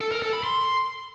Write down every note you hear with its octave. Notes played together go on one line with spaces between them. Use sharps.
A4
A#4
A4
B5
C6